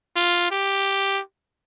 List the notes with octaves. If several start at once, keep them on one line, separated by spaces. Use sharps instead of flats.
F4
G4